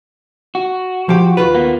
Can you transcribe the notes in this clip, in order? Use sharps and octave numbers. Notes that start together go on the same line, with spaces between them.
F#4
F3 G4
D#2 F4 B4
A#3 B3